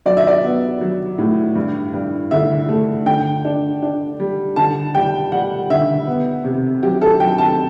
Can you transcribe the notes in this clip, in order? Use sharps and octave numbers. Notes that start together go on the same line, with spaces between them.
F#3 D5
E5
D5
B3
F#3
A2
G2
G2
D3 E5
A3
D3 G5
D4
D4
G3
D3 A5
G3 G5
G3 F#5
D3 E5
B3
C3
F#3 G4
A4
F#3 G5
A5